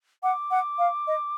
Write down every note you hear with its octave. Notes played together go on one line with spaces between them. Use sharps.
F#5 D6
F#5
F5
D#5